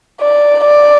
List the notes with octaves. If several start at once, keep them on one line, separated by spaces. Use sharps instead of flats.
D5
D5